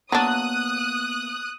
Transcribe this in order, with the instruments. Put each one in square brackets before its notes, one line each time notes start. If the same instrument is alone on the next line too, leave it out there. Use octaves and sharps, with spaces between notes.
[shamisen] F#3 D4 [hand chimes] A#3 B3 [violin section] D#6 F#6